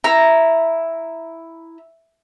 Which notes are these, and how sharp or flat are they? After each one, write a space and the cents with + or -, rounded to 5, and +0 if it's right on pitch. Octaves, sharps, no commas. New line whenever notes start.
E4 +0 A#5 +0